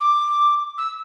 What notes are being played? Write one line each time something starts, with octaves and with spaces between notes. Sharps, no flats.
D6
E6